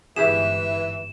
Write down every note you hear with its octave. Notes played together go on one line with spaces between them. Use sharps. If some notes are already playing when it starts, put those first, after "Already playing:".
G1 G#2 E3 E4 G4 G#4 E7